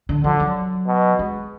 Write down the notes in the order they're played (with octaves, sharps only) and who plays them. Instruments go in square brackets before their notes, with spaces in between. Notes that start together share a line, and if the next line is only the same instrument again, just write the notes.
[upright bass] D3
[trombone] D3 [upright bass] F3
[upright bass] F#3
[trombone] B2
[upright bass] G#3